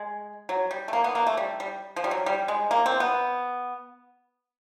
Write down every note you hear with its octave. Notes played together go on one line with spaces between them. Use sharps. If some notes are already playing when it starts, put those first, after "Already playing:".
Already playing: G#3
F#3
G3
A3
A#3
B3
A#3
A3
G3
G3
F3
G3
F#3
G3
G#3
A#3
C4
B3